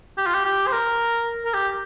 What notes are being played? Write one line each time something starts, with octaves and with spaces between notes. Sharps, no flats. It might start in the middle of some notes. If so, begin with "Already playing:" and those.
G4
F4
G4
G4
C5
A#4
A#4
G4